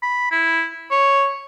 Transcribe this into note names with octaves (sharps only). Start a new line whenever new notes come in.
B5
E4
C#5